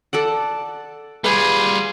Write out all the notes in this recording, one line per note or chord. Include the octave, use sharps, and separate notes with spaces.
A4 D5 F#5
G3 F4 G#4 B4 B5